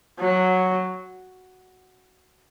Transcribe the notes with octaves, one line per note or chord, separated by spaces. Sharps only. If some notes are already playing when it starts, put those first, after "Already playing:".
F#3